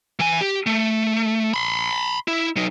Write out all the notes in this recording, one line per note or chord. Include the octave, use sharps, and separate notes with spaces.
E3 G#5
G4
A3
B5 C6
E4
F#3 D#4